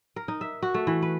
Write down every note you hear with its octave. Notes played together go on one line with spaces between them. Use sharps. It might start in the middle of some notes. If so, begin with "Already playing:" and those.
A#4
D#4
E5
F#4
A3
E3
B4